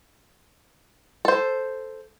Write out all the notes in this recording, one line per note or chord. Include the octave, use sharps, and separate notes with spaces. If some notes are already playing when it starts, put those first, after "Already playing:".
A4 C5